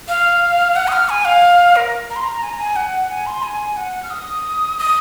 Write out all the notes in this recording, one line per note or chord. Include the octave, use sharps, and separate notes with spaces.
F5
F#5
D#6
F6
G#5
F5
A#4
A#5
C6
A#5
G#5
A#5
G#5
F#5
G#5
C6
G#5
F#5
F6
D#6
D#6